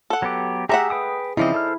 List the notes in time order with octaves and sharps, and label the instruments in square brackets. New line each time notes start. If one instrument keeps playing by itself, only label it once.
[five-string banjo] A4 F#5
[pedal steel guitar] F#3 B3 G4
[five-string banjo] A3 E5 F#5 [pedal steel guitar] G4 A#5 [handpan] G#4
[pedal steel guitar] B4 G5 D#6
[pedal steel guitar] C#3 F3 C4 [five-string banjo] D#4 D5 D#5 [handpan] E4
[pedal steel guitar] A4 C5 F6